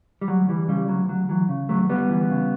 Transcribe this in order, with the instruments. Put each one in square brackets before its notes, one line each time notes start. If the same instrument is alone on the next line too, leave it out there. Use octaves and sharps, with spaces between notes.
[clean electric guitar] G3
D2 F#3
E3 G3
C#3 G3
D2 F#3
D2 F#3
E3 F#3
C#3
D2 F#3 A3
D2 G3 B3
E3
C#3